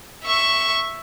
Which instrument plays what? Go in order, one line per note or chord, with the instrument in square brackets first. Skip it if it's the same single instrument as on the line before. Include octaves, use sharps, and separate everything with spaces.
[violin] E5 C#6